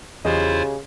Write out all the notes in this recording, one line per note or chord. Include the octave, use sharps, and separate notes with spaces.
E2 C#3 E4 F4 G4 G#4 C5 D#5